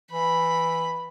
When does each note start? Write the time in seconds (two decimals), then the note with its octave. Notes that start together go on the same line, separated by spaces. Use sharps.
0.11 E3 B5